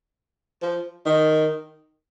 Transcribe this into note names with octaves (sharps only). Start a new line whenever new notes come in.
F3
D#3